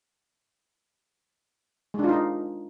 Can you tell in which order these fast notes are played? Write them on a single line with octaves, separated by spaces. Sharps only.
G#3 D4 F4 D#4